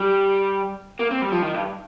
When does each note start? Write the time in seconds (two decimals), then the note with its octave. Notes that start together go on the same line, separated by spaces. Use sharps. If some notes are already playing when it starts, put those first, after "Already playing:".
Already playing: G3
1.00 A#3
1.11 C4
1.22 G3
1.32 F3
1.43 D#3
1.54 G2